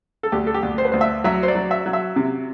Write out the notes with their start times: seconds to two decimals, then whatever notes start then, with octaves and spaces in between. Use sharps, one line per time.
0.23 A4
0.32 D2 G4
0.47 A4
0.54 G4
0.63 D2
0.78 C5
0.85 B4
0.92 D2 C5
1.01 E5
1.24 F#3 E5
1.43 C5
1.48 D5
1.55 F#3
1.71 E5
1.86 F#3
1.93 E5
2.16 C3